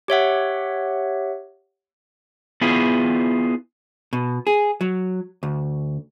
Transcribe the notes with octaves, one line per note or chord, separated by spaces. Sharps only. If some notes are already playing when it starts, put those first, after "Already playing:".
G4 C#5 E5 F#5
B3 E4 F4 G#4
B2
G#4
F#3
D2